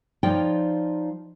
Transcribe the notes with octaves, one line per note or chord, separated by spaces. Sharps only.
F3 D#4 F4 C#5 D5 G5